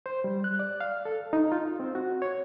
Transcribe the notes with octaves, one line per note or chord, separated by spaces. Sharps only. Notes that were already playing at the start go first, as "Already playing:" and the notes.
C5
G3
F#6
D5
F5
A4
D#4
F4
C4
F#4
C#5